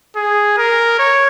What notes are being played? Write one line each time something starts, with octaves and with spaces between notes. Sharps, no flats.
G#4
A#4
C#5